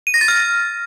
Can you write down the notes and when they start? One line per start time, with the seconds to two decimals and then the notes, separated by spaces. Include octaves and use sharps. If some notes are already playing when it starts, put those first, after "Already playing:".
0.07 D#7
0.14 A#6
0.21 A6
0.28 F6